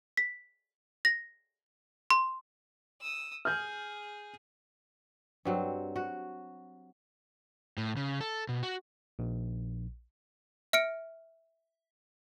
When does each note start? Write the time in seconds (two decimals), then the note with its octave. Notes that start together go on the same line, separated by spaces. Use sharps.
0.17 B6
1.05 A#6
2.10 C6
3.00 D#6 E6
3.45 G#4 F6 G6
5.45 G2 F#3 C4
5.96 F#4
7.78 A2
7.97 C#3
8.21 A4
8.49 B2
8.63 F#4
9.19 A#1
10.73 E5 F6 C#7 D7